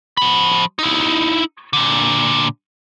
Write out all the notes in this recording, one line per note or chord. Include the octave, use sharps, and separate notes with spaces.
F3 B5
D#4 E4
A#2 D3